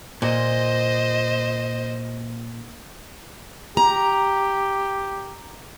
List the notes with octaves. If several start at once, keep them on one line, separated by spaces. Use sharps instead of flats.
A#2 C5 D#5
G4 A#5